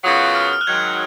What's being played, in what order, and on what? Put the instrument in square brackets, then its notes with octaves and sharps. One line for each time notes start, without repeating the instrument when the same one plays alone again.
[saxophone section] F#2 C#3 F#3 B3 F4 [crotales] D#6
[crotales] F6
D#6
F6
F#6
[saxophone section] G#2 D#3 F#3 [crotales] G#6